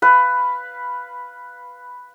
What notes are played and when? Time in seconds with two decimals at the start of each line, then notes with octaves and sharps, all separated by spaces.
0.02 B4 F5